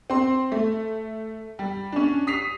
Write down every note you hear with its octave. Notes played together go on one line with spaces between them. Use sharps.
C4 C6
A3
G3
C#4 D4
D#6 B6 C7 F7